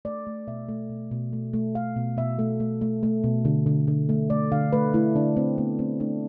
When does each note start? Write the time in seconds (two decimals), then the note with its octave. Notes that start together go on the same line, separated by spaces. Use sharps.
0.05 A3 D5
0.27 A3
0.47 B2 E5
0.69 A3
0.90 B2
1.11 B2
1.33 A3
1.53 A3
1.75 A3 F5
1.96 B2
2.17 B2 E5
2.39 A3
2.60 A3
2.81 A3
3.03 A3
3.24 B2
3.45 D3
3.66 D3
3.88 D3
4.09 A3
4.30 A3 D5
4.51 D3 F5
4.73 A3 B4
4.94 A3 E4
5.15 D3 D4
5.36 A3 C4
5.58 A3 B3
5.79 A3 C4
6.00 A3 D4